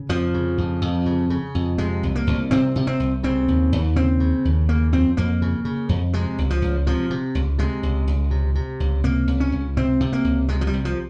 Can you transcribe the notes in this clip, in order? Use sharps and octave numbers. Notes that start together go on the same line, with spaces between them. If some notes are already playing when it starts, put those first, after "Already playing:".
Already playing: C#3
F2 F3
C#3
F2
F2
C#3
C#3
F2
C3 G#3
C2
A#3
C2
C3 C4
C3
C4
C2
C#3 C4
D#2
D#2
C#3 C4
C#3
D#2
C#3 A#3
F2 C4
F2 A#3
C#3
C#3
F2
C3 G#3
C#2
F3
C#2
C3 F3
C3
C#2
C3 G#3
C#2
C#2
C3
C3
C#2
C3 A#3
C#2
C#4
C#2
C3 C4
C3
A#3
C#2
C3 G#3
F3
G3
C2
F3